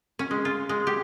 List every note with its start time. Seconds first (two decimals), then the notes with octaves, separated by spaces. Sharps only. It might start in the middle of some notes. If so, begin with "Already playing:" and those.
0.19 C#4
0.31 G#3
0.45 F4
0.69 G#3
0.87 G4